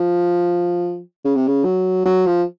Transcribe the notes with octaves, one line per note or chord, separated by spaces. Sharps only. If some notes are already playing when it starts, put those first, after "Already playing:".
Already playing: F3
C#3
C3
C#3
F#3
F#3
F3